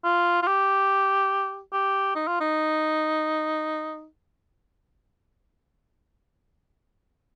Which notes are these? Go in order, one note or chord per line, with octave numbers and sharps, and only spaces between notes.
F4
F4
G4
G4
D#4
F4
D#4